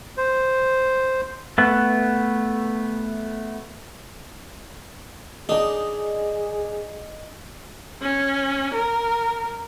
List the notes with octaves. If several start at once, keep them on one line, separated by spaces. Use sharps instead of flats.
C5
A3 B3
D4 D#4 G#4 D#5 D6
C#4
A#4